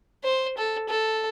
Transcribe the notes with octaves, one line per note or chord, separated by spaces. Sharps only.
C5
A4
A4